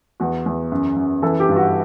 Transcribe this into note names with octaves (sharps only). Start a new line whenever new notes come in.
E2 F#4
E2
F#2
F#2
E3 A4
G4
G2
F#4